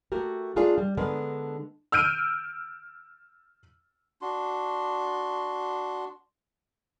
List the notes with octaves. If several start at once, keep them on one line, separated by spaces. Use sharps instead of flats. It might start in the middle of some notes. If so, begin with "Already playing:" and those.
A3 F#4 G4 A#4
A3 D4 F4 G#4 A#4 D5
G3
D3 G#3 B3 D4 A#4
E6 F6 G6 D7 D#7
D4 F#4 C6